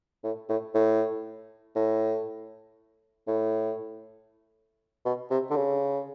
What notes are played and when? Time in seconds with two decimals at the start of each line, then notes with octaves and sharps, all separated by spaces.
0.24 A2
0.49 A2
0.75 A2
1.76 A2
3.28 A2
5.05 B2
5.30 C3
5.51 D3
5.56 C#3